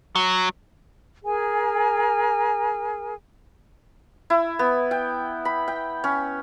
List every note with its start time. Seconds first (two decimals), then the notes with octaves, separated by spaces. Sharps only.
0.15 F#3
1.24 G#4 A#4 G#5
4.30 E4
4.59 B3
4.91 G5
5.45 B5
5.68 G5
6.04 C#4